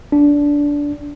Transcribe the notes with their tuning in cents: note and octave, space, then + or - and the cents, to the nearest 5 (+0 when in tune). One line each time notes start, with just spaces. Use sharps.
D4 -15